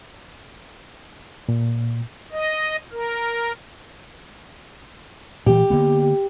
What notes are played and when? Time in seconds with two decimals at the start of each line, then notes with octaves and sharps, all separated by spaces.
1.49 A#2
2.31 D#5
2.92 A#4
5.46 A#2 E3 G4
5.70 D3 A#3 B3